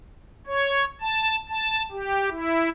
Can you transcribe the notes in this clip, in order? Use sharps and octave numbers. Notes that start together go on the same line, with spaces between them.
C#5
A5
A5
G4
E4